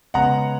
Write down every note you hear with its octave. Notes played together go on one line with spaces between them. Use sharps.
C#3 G#3 B3 F#5 A#5